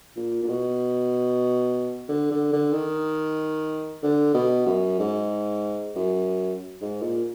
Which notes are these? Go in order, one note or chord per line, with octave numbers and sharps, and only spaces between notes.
A#2
A#2
B2
D3
D3
D3
D#3
D3
B2
F#2
G#2
F#2
G#2
A#2